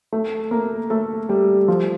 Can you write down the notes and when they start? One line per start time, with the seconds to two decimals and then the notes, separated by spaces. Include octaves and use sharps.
0.13 A3 A4
0.51 A#3 A#4
0.90 A3 A4
1.29 G3 G4
1.68 F3 F4